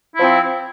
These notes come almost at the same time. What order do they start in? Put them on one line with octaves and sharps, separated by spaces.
E4 F3 C4